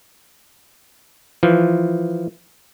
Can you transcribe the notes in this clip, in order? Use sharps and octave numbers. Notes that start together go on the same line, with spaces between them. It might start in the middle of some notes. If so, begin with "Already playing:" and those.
E3 F3